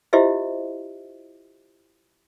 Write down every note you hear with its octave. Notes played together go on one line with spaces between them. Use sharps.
E4 F4 G4 C5 D#5 E5